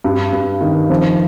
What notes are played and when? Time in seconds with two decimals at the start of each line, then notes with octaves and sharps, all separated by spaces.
0.04 G2
0.33 G2
0.61 D#3
0.90 F3